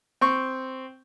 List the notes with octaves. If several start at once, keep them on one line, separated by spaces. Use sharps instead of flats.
C4 C#6